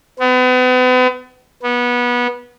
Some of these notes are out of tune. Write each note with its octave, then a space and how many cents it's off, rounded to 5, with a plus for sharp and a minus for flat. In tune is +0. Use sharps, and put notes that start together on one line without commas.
B3 +40
B3 -20